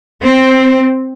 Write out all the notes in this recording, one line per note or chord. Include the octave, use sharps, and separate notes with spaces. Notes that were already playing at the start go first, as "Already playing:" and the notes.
C4